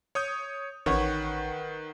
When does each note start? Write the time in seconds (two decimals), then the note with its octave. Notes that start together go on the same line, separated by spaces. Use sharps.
0.15 C#5 D#6 G6
0.86 A1 D#3 B4 C#5 F#5